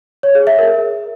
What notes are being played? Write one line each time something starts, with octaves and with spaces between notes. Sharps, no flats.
C#5
G#4
E5
A#4